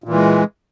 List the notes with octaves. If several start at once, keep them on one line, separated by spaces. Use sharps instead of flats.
A#2 E3 G#3